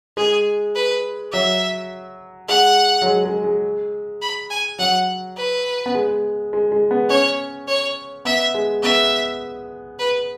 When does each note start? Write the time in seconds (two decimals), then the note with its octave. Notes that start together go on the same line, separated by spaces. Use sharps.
0.17 G#3 G#4
0.75 B4
1.32 F#3 E5
2.48 G#3 F#5
3.02 F#3
3.06 G#3
3.25 G#3
3.44 G#3
4.22 B5
4.50 G#5
4.79 F#3 F#5
5.37 B4
5.86 B3
5.95 G#3
6.53 G#3
6.72 G#3
6.91 B3
7.10 C#4 C#5
7.68 C#5
8.25 B3 E5
8.54 G#3
8.83 B3 E5
9.99 B4